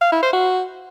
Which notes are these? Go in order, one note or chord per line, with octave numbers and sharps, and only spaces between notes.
F5
E4
C5
F#4